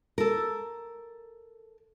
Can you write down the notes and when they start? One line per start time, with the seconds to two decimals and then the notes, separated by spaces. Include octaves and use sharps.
0.18 A4 A#4